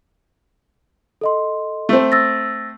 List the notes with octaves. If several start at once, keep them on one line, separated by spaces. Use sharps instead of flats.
A4 D#5 C6
A3 C4
E6 A6 A#6